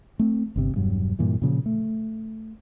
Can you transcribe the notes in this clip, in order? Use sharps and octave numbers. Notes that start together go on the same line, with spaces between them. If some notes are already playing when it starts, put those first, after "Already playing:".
A3 C4
G1 C3
E1 G2 F#3
G2 A#2 E3
A#2 C#3 F3
A3